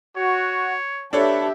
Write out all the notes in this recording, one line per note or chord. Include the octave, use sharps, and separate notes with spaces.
F#4 C#5
D4 G4 A4 B4 C#5 E5 A5